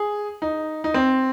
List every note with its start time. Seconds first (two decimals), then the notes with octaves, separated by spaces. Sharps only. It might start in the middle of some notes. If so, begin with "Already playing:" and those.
Already playing: G#4
0.42 D#4
0.84 D#4
0.94 C4